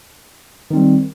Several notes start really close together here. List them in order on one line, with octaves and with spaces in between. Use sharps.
D#3 C4 G3